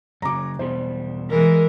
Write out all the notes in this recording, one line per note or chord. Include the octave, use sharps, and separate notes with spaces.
F#2 C#3 F#3 A#5 D6
E2 B2 G3 C5
E3 G#3 A#4